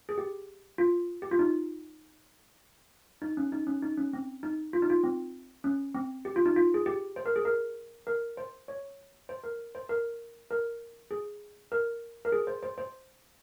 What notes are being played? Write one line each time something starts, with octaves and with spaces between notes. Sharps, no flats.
G#4
G4
F4
G4
F4
D#4
D#4
C#4
D#4
C#4
D#4
C#4
C4
D#4
F4
D#4
F4
C4
C#4
C4
G4
F4
D#4
F4
G#4
G4
C5
A#4
G#4
A#4
A#4
C5
C#5
C5
A#4
C5
A#4
A#4
G#4
A#4
A#4
G#4
C5
C5
C5